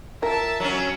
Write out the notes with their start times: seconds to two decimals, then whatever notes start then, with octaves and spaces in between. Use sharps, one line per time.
0.22 F4 A#4 E5 A5
0.60 F#3 C#4